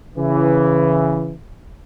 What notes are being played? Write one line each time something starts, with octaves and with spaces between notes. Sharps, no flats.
C#3 E3